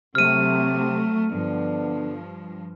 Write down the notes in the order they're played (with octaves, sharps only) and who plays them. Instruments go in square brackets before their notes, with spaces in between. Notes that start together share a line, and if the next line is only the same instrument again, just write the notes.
[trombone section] C3 [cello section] F#3 A3 C4 [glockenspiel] F6 D#7
[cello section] G2 F3 [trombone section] D3 B3 D4